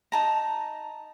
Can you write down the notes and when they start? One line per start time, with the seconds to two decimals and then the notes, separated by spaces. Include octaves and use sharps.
0.12 D#4 A5 A#5